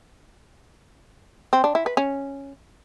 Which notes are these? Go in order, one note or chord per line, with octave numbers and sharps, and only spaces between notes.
C4
D4
E4
B4
C#4